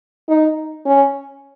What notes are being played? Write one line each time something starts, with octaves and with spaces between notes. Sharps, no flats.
D#4
C#4